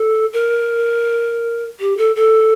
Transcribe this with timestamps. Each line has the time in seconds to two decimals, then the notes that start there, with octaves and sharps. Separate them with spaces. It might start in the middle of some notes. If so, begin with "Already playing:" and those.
Already playing: A4
0.33 A#4
1.80 G4
1.98 A4
2.16 A4